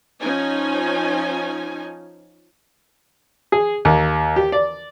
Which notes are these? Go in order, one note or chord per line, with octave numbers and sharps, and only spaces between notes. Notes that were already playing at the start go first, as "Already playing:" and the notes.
F3 C#4 D#4 G#5
G#4
D#2
G4
D5